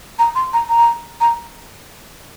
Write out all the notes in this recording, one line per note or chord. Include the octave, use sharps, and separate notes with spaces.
A#5
C6
A#5
A#5
A#5